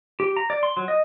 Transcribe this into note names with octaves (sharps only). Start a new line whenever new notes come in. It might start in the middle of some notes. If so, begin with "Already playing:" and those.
G4
A#5
D5
C6
F#3
D#5